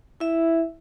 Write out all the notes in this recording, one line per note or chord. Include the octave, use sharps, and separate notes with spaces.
E4 E5